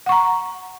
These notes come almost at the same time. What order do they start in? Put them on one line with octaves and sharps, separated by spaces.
F#5 C#6 A#5